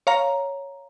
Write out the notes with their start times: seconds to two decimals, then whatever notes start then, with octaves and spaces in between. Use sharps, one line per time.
0.07 C#5 F5 A#5